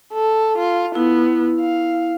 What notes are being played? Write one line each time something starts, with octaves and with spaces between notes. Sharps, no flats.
A4
F4
B3 E4
F5